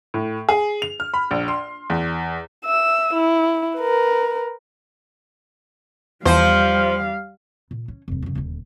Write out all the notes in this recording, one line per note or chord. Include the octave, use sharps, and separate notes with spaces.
A2
G#4
F7
F6
B5
A#1
C6
E2
E5 E6
E4
A#4 B4
E2 F3 G3 C5 F5
A#2
C#4
F1 F#2
F#2 C#3
D#1 D2